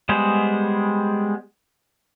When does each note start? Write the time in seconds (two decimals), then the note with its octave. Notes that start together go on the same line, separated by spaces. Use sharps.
0.09 G3 G#3 B3 G#4 C5